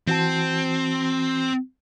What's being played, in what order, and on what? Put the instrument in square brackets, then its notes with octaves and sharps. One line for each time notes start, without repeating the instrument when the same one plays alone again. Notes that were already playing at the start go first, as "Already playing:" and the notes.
[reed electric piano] E3 F#4 A5 [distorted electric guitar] C4